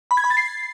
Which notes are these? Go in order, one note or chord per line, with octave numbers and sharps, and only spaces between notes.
B5
G#6
B5
A6
C7